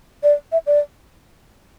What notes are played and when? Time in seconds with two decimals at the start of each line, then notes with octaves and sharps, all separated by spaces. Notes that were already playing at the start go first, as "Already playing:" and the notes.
0.23 D5
0.52 E5
0.67 D5